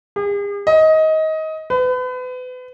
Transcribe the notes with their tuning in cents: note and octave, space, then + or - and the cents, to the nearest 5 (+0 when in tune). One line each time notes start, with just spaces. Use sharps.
G#4 -45
D#5 +20
B4 +35